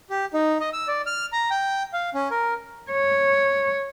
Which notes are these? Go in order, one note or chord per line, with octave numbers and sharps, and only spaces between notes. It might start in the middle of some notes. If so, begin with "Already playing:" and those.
G4
D#4
D#5
E6
D5
F6
A#5
G5
F5
C#4
A#4
C#5